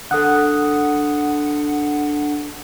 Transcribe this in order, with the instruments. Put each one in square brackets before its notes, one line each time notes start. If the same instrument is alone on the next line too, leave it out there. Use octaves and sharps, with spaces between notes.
[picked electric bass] D3 [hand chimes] A4 D#6 F#6 [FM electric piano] F#5